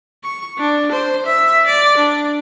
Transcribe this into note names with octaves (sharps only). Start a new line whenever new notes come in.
C#6
D4
C5
E5
D5
D4